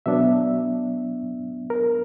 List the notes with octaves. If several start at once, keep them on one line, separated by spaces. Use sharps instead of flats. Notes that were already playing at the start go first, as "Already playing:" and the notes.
B2 F#3 B3 D4 E5
A#4